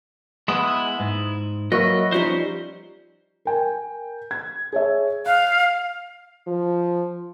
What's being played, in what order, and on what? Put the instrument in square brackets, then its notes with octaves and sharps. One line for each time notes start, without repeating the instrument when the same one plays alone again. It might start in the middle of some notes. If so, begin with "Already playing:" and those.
[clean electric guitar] G#3 B3 [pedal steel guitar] E4 D#6 E6
[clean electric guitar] G#2
[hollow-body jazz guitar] F#3 A#3 [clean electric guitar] B4 C#5 E5 [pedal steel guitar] D#5
[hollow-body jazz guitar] F3 G3 D#4 [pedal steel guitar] C#4 C5
[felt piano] A#4 G5 G#5
G#6
G#4 C#5 E5
[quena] F5 [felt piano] F#6
[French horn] F3